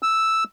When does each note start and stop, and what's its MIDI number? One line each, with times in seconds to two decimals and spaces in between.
0.03 0.44 88